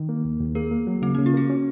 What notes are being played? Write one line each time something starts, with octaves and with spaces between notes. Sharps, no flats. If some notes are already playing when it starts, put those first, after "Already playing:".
Already playing: D#3
A#3
D#2
D#2
A#3 G#4
A#3
F#3
C#3 A#3
C#3 C#4
F4
A#3 F#4
C#4